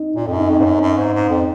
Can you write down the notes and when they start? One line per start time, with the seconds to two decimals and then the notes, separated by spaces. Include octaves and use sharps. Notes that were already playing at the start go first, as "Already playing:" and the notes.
Already playing: D#4
0.16 A#2 D#4
0.27 F2
0.33 F#2
0.38 D#4
0.49 F2
0.60 G#2 C#4
0.65 F#2
0.81 F#2
0.97 G#2
1.14 G#2
1.29 F2